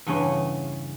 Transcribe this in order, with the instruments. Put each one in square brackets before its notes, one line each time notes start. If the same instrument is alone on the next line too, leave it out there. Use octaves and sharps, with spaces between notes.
[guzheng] E2 G2 C#3 C#4